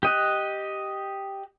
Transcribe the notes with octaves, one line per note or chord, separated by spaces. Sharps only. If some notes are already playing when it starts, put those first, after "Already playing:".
G4 D#5 F#6